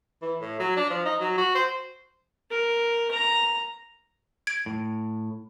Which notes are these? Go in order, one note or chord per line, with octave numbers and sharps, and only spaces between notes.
E3
A2
F#3
D4
F3
D#4
F#3
F#4
C5
A#4
A#5
G#6 D7
A2